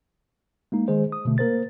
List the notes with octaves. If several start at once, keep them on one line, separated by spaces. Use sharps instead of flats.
G#3 A#3 D#4
D#3 G#3 G#4 C5
D#6
B2 D3 A3
A#3 A#4 C5 A6